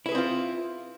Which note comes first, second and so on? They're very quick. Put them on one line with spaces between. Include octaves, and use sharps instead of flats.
E4 B4 G#4 C4 F4